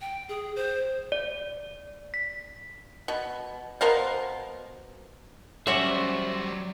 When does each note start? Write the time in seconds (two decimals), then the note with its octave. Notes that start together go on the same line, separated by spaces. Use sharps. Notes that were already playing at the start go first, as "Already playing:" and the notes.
0.01 G5
0.29 G#4
0.56 C5
1.12 D5
2.14 B6
3.08 B2
3.81 B2 A#4 C5 F5
5.67 F#3 G3 C#4 F#4 C5 D5 E5